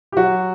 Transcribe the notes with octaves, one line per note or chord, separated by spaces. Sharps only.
G4
F#3 F#4